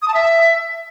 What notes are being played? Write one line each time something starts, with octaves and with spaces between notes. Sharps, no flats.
D#6
A5
E5